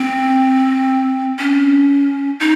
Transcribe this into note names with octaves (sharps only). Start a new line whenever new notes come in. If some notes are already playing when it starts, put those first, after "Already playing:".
Already playing: C4
C#4
D#4